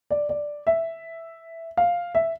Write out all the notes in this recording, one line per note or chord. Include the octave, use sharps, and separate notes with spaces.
D5
D5
E5
F5
E5